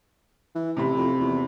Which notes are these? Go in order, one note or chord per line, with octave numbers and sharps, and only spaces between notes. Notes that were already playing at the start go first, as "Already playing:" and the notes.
E3
A1 C3 B5
F2
E2